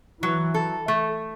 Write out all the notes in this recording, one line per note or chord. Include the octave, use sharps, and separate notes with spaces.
E3 F#3
A4
A3